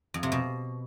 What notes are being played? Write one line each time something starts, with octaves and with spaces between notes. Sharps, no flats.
F2
C3
B2